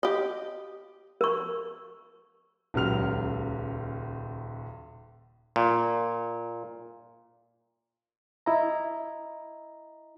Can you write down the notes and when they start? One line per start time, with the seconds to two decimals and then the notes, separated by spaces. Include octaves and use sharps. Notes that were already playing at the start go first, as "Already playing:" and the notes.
0.03 G4 D#5
1.21 A#4 C#6
2.74 D#1 C#2 F#3 F6 F7
5.56 A#2
8.46 E4 D#5 A#5